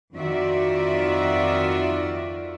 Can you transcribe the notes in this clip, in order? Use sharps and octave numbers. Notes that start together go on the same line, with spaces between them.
F2 D#3 F4 F#4 D5 E5